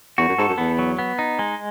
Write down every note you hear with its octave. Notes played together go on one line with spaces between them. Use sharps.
E2 F#4
F#2
G#2 A4
F#2
E2 B3
F#3
B3
D#4
G#3